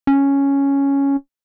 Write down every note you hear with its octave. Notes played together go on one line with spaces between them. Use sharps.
C#4